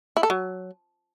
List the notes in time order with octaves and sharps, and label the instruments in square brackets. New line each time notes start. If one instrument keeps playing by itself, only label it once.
[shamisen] E4
A4
F#3